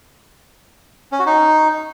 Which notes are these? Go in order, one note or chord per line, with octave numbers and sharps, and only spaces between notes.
C#4
F#4
D#4